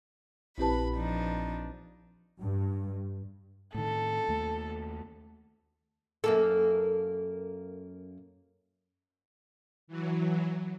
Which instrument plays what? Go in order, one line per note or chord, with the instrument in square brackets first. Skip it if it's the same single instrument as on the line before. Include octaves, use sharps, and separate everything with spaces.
[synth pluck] A#1 C4 B4 [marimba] E4 G4 A5 [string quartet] B5
[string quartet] F3 D4 D#4
[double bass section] G2
[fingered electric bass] A2 D#3 [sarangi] A4
[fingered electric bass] D#2 A3
[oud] F#2 A#3 A4
[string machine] E3 F#3